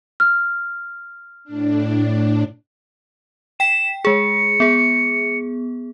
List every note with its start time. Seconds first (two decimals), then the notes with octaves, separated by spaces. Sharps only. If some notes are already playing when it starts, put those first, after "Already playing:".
0.20 F6
1.44 A2 D4
3.60 G5 B6 E7
4.05 G#3 G#4 C#7
4.60 B3 G#4